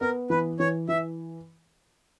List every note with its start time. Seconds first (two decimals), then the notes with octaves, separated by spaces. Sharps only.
0.01 B3 A#4
0.30 E3 B4
0.59 E3 C#5
0.89 E3 E5